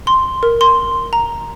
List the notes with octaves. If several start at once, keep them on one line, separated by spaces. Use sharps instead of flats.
C6
A#4
C6
A#5